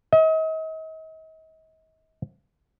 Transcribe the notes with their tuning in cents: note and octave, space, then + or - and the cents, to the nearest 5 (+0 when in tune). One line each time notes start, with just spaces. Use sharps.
D#5 +40